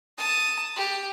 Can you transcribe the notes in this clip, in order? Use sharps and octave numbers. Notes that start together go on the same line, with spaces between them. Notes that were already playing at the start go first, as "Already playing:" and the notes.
A5 D#6
G4